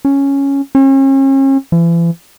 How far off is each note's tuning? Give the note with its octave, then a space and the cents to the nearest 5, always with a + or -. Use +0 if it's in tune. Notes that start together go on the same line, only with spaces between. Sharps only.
C#4 +0
C#4 -40
E3 +40